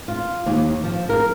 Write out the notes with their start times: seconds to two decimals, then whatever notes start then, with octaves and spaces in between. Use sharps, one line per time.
0.08 F4
0.46 D#2
0.84 F3
1.09 A#4